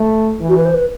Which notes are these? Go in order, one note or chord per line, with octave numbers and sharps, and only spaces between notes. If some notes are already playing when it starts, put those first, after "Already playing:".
Already playing: A3
E3
F#4
B4
C5
B4